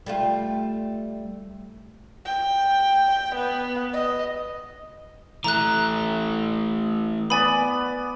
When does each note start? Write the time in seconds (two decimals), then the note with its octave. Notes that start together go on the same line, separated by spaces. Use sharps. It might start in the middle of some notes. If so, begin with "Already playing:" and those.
0.06 G3 A3 F4
2.25 G5
3.35 B3
3.93 D#5
5.44 E3 A3 A#5 F#6
7.30 B3 D5 G#5 B5